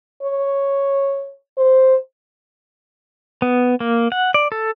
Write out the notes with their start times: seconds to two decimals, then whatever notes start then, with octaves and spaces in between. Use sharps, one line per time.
0.23 C#5
1.58 C5
3.42 B3
3.80 A#3
4.12 F#5
4.34 D5
4.52 A4